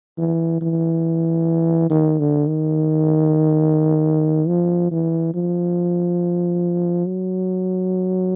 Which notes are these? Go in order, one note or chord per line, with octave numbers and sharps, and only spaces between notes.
E3
E3
D#3
D3
D#3
F3
E3
F3
F#3